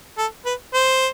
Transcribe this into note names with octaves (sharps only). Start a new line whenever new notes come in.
A4
B4
C5